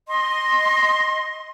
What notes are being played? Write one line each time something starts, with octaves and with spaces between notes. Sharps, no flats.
D#5 C6